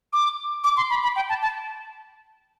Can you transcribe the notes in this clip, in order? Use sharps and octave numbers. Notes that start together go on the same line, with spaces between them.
D6
D6
C6
B5
B5
G5
A5
A5